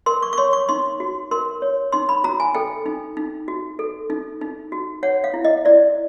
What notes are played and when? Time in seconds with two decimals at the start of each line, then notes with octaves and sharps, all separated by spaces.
0.06 A#4 C6
0.22 C#6
0.33 C#6
0.38 C#5 C6
0.53 C#6
0.69 D#4 C6
1.00 F#4
1.31 A#4 C6
1.62 C#5
1.92 D#4 C6
2.09 B5
2.24 F#4 A#5
2.40 G#5
2.55 A4 G5
2.86 D#4
3.17 D#4
3.48 F#4
3.79 A4
4.10 D#4
4.41 D#4
4.72 F#4
5.03 C#5 F#5
5.24 F5
5.34 E4
5.45 D#5
5.65 E4 D5